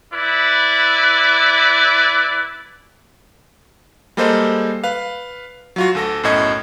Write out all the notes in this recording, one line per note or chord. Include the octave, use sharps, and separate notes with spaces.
E4 B4 D5
G3 G#3 A#3 A4 C5 D#5
B4 F5
F#3 F4 F#4
D2 A4 A#6
B1 F#2 A2 D#5 G#6